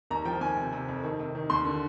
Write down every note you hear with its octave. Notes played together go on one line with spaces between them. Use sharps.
D#2 A#5
F3 G5
D#2 G#5
C3
C3
F2
D#3
C3
D#3
D#2 C6
D3